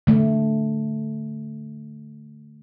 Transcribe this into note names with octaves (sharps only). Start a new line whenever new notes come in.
D3 A3